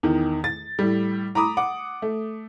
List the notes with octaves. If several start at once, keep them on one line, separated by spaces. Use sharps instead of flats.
E2 D#3
A6
A2 G3
A#5 B5 D6 D#6
F#5 D6
A3